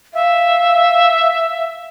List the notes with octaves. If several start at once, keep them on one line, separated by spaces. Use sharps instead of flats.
E5 F5